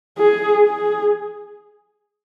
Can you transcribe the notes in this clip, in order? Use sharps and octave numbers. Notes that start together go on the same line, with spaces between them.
G#4
G#4